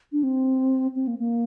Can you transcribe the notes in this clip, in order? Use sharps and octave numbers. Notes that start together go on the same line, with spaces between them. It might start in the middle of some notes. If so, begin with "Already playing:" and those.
D4
C4
C4
A#3
A#3